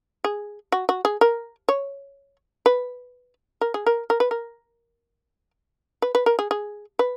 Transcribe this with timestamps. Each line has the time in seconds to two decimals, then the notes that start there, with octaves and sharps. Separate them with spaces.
0.24 G#4
0.72 F#4
0.89 F#4
1.05 G#4
1.21 A#4
1.69 C#5
2.66 B4
3.61 A#4
3.74 G#4
3.86 A#4
4.10 A#4
4.20 B4
4.31 A#4
6.02 B4
6.15 B4
6.26 A#4
6.39 G#4
6.51 G#4
6.99 B4